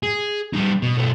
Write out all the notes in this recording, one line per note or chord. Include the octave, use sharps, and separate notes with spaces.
G#4
G3 D#4
B2
B1 A3